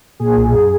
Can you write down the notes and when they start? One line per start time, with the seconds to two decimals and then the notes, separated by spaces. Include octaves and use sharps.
0.20 A#2 G#4
0.36 B1
0.53 F#2